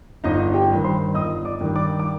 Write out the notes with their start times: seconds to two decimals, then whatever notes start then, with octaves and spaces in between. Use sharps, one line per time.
0.24 G1 D#4 D#5
0.54 G4 G5
0.70 G2 D#3
0.84 C5 C6
1.14 G1 D#5 D#6
1.45 D5 D6
1.61 G2 D#3
1.75 D5 D6
2.00 D6